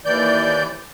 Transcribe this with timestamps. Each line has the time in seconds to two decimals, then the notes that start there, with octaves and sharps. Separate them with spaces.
0.05 D#2 E3 D5 G6